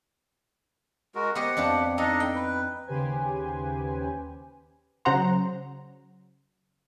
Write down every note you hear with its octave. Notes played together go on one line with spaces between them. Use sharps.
G#3 F#4 A#4
B3 G4 C5 D#5 F#5
F2 D4 B4
D4 D#4 A4 D#5
G5
B4
D#2 C#3 G4 B4 C5 G#5
C#3 F#3 C5 F#5 A#5 C6